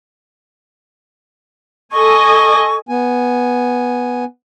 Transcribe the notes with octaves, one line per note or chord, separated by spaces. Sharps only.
A4 D#5 G#5 C#6
B3 G#5